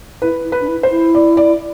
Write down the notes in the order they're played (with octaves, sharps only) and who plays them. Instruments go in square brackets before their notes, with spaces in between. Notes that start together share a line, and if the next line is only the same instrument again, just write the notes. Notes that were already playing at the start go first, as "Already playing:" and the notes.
[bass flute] E4 [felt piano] B4
[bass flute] E4
[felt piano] B4
[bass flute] D4
E4
[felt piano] C5
[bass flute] E4
[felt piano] D5
D5